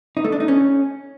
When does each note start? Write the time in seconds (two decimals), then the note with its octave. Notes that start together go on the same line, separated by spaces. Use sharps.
0.17 D#4
0.25 A3
0.32 D4
0.40 D#4
0.48 C#4